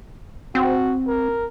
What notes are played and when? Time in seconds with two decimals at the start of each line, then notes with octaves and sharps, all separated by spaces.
0.55 C4 F#4
1.07 A#4